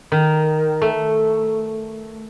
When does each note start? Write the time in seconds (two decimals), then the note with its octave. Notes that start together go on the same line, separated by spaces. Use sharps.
0.12 D#3
0.82 A3